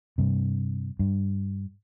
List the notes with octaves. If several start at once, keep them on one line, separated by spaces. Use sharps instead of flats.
G2 C3
G2